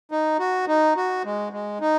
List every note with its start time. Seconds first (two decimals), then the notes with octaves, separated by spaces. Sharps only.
0.12 D#4
0.40 F#4
0.68 D#4
0.97 F#4
1.25 G#3
1.53 G#3
1.81 D#4